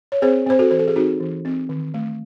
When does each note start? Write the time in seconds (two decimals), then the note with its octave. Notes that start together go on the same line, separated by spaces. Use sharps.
0.12 C#5
0.22 C4 G#4 C5
0.46 C4 C5
0.59 F#4 A4
0.71 E3 C5
0.79 A4
0.88 G#4
0.96 C4 D#4 F#4
1.20 E3
1.45 C4
1.69 D#3
1.94 A3